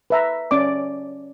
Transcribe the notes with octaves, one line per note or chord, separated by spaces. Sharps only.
B4 E5 A#5
C#4 D5 D6